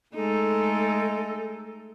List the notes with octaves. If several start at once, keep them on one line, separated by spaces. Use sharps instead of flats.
G#3 A3 D#4 A4